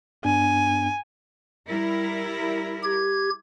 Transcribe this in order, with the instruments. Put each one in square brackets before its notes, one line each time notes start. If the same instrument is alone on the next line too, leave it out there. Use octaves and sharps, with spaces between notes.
[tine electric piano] G2 B3 D4 [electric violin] G#5
[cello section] G3 E4 A#4
[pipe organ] G4 G#6